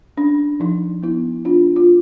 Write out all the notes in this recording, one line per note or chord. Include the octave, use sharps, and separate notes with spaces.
C#4 D4
F3 D#4
B3 E4
D4 F4
F4